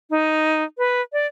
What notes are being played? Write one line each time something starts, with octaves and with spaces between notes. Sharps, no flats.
D#4
B4
D5